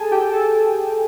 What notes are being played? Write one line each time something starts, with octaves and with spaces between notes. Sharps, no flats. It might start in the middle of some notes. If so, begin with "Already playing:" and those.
Already playing: G#4 A4 G#5 A5
G4 G5
A4 A5